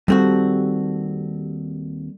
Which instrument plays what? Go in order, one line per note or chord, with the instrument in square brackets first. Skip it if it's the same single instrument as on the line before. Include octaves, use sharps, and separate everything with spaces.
[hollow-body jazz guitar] D#2 C4 F#4 [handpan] G3 A4